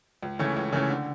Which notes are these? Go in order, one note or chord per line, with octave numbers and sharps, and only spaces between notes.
C#2
C#3 E3 A3 C#4
C#2
C#3 E3 A3 C#4
D3